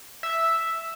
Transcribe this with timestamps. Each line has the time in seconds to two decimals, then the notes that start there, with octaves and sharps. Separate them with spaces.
0.23 E5